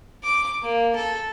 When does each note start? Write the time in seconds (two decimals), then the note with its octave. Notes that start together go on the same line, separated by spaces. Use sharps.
0.24 D6
0.63 A#3
0.96 A4